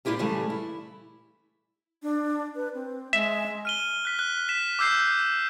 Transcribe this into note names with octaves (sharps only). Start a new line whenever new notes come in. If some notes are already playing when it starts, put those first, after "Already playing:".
A#2 F3 E4 F4 G4 A#4
A#2 C#3 E3 G3 A3
E4
D4
B4
C4
G#3 E5
F6 D#7 G7
F#6 B6
F#6
B6 E7
D6 E6 G6 C7 E7
G6